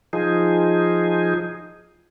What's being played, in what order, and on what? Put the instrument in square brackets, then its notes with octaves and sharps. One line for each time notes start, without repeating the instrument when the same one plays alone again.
[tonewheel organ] F3 D#4 G#4